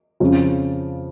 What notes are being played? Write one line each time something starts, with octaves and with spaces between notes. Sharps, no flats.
F2 C#3 F3